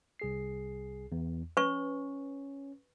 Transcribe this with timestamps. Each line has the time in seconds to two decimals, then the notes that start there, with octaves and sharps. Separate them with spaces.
0.19 C2 G#4 C7
1.12 E2
1.57 C#4 B4 C#6